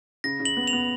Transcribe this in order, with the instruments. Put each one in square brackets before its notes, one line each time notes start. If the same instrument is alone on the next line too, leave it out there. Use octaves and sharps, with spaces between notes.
[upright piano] C#3 [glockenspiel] A#6
[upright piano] C#3
[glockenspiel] F#7
[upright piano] B3
[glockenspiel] F7
[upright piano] B3